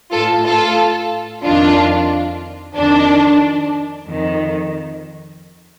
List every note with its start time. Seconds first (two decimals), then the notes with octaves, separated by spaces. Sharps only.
0.11 A2 F4 A4
0.45 F4 A4
1.43 F2 D#3 D4 F4
2.75 F2 D#3 D4
4.07 F2 D#3